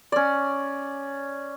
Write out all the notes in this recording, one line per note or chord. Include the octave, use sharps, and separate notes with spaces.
C#4 D5